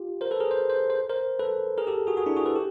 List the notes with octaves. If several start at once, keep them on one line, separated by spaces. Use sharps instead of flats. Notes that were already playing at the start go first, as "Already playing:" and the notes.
Already playing: F4 G4
A#4 C5
A4 B4
G#4 A#4
C5
C5
C5
A#4 C5
A4 B4
G#4 A#4
G4 A4
F#4 G#4
F#4 G#4
D4 E4
F#4 G#4
A4 B4
G4